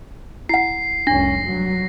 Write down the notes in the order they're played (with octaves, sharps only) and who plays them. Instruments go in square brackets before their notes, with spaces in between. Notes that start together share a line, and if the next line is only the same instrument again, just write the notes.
[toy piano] E4 F#5 [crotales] C7
[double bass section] F1 C2 C#4 [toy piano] D4 [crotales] A#6
[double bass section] G2 F#3